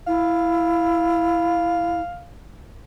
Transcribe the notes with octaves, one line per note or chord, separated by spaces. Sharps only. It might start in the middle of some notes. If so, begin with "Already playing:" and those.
E4 F5